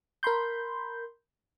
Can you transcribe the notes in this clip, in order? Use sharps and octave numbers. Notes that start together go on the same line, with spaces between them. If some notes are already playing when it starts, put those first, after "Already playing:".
A#4 B5 C6 G6